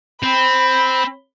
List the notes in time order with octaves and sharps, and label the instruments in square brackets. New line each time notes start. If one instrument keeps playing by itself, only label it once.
[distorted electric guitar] C4 [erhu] B5